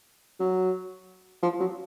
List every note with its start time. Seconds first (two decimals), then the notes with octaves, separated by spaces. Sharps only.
0.40 F#3
1.43 F3
1.60 F#3